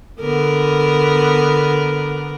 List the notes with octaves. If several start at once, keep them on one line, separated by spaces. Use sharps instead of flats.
D3 B3 A#4